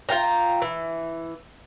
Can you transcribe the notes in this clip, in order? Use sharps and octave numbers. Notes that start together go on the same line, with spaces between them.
F4 F5 G5 A#5
E3